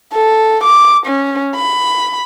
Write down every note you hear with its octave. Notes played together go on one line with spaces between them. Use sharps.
A4
D6
C#4
B5